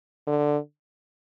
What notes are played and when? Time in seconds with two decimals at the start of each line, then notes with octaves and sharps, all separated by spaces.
0.27 D3